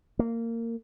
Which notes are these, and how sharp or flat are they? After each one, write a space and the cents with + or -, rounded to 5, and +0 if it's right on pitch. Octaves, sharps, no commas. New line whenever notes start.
A#3 -20